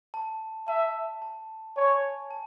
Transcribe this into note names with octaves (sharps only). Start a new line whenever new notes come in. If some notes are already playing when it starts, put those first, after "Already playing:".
A5
E5 A5
A5
C#5 G#5
A5